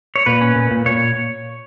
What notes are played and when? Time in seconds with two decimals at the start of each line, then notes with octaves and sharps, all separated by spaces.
0.16 C#5
0.26 A#2 B4
0.41 C#4
0.56 A#2
0.71 A#2
0.86 A#2 C#5